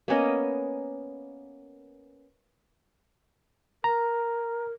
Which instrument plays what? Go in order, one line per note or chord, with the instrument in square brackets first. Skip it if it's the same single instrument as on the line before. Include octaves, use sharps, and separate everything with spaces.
[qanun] A#3 B3 C#4 D#5
[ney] A#4 [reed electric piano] A#5